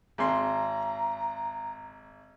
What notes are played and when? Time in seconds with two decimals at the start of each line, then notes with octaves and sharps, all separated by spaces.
0.18 G#1 A#5 C6